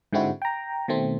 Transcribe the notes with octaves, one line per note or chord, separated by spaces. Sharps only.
G#2 D3 G#3 C4 E4 F#4
G5 A#5
B2 D#3 A3 C4